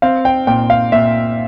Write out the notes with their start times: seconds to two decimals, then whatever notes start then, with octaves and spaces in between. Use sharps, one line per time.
0.02 C4 F5
0.25 G5
0.47 A#2 G5
0.70 F5
0.92 A#2 E5